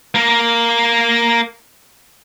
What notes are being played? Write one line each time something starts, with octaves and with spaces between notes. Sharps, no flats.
A#3 A#4